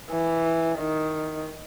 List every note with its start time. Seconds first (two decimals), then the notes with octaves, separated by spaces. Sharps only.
0.10 E3
0.79 D#3